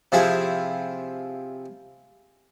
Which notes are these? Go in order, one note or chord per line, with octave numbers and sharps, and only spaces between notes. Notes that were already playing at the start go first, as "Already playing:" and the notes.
C3 F3 E4 G#4